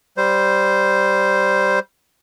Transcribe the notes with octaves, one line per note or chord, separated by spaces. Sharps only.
G3 C5